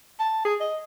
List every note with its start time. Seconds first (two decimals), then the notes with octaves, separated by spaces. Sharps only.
0.19 A5
0.45 G#4
0.60 D#5